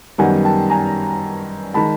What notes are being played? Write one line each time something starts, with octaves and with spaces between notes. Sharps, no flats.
F#2 D#3 G3 B3 F#5 G#5
G5 A5
G#5 A#5
D#3 G#3 A5 B5